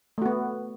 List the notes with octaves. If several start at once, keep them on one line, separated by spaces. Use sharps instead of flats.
A3 B3 F#4